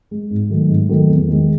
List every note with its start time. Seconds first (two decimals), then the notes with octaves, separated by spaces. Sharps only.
0.11 G#3
0.31 G#2
0.50 D#3 F#3 A3
0.69 G#2
0.89 D#3 F#3 A3
1.09 E2
1.28 D#3 G#3